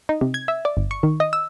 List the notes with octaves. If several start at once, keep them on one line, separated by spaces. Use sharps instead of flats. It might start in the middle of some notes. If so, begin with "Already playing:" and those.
D#4
C3
G#6
E5
D5
G1
C#6
D#3
D#5
E6